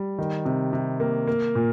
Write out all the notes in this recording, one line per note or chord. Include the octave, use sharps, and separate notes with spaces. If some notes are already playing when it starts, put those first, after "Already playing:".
Already playing: G3
D#3
C3
C3
A#3
A#3
A#2